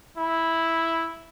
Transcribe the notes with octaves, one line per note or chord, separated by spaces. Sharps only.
E4